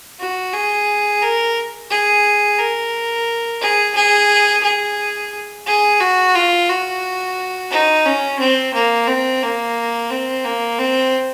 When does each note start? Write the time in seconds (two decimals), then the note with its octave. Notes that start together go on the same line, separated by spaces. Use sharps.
0.20 F#4
0.54 G#4
1.22 A#4
1.90 G#4
2.59 A#4
3.61 G#4
3.95 G#4
4.63 G#4
5.67 G#4
6.00 F#4
6.35 F4
6.69 F#4
7.71 D#4
8.05 C#4
8.39 C4
8.74 A#3
9.07 C4
9.42 A#3
10.10 C4
10.44 A#3
10.79 C4